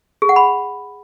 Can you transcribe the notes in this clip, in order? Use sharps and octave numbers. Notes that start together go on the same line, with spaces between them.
G#4
F#5
B5